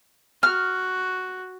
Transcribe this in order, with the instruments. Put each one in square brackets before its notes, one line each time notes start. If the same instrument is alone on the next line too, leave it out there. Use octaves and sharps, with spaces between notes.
[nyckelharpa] F#4 [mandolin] F6